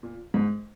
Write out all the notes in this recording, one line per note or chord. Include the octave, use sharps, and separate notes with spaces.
A#2
G#2